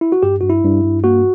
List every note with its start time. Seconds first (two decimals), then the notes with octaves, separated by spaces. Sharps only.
0.01 E4
0.12 F#4
0.23 G2 G4
0.41 G2 F#4
0.50 E4
0.64 G2
0.84 G2
1.04 A#3 F#4